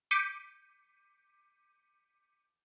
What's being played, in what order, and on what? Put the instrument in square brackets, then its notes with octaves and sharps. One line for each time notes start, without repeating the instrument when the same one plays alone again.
[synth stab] D6 G6 B6 C#7 D#7